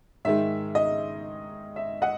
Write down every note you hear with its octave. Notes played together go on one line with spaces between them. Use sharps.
G#2 D#3 G#3 E5
D#5
E5
D#5 F#5